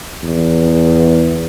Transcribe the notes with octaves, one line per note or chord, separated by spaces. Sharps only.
E2